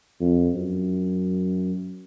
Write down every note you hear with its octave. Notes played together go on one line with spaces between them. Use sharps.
F2
F#2